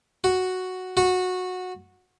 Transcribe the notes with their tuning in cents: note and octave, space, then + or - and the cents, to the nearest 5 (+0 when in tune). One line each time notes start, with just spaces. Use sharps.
F#4 +0
F#4 -15